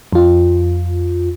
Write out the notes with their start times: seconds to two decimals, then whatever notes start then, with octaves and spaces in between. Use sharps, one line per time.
0.13 F2 F4